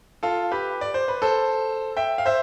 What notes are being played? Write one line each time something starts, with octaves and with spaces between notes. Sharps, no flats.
F4 A4
G4 B4
D5
C5
B4
A4 C5
E5 G5
F5
C5 E5